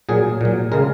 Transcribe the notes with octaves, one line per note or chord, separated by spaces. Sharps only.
A#2 F#3 G#4
A#2 F#3
C#3 G#3 A#4